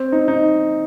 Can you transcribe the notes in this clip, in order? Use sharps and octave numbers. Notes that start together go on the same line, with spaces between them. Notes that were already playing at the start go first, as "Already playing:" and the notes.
Already playing: C4
D#4
D#4